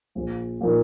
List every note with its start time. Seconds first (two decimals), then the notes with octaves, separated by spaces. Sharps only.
0.15 A#1
0.61 A#2 F3 A#3 D#4